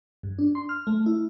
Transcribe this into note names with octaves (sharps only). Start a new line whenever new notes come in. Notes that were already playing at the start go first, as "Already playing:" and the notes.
G2
D4
C6
F6
A3
E4